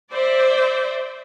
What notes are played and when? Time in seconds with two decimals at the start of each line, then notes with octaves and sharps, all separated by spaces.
0.11 C5 D5 E5